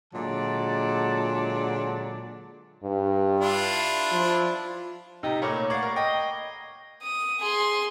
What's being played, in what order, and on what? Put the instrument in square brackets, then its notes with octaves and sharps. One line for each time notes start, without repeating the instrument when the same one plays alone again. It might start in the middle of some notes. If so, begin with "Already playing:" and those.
[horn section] A#2 D3 F#3 G#3 D5 A5
[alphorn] G2
[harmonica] D4 E4 F4
[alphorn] F3
[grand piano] C3 G4 [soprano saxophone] D#4
[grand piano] A#2 A3 A#3 [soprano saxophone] C#5 [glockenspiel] A#5 B5 D6
[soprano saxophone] A#3 [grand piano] D5 F#5 [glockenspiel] C#6 G#6 C7
[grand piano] A#4
[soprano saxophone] D#5 [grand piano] G5
[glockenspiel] G7
[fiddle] D#6
G#4 C6